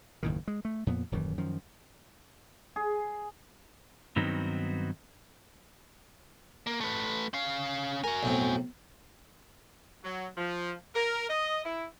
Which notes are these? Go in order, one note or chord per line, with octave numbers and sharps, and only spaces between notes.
F#1 D#2 A2 D#3
G#3
A3
F2 A#2 B3
D#1 F#2 D#3 E3
F#2 D#3 F3
G#4
G2 D#3 F#3 B3 C4 D#4
A#3
A3 B4
C#4 F5
F#4 A#4 G#5
B1 A2 C4
F#3
F3
A#4
D#5
E4